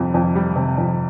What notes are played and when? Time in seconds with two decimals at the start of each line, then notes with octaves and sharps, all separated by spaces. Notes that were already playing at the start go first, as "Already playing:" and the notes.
Already playing: F2 C3 G3
0.14 F2
0.35 G3
0.56 C3
0.78 F2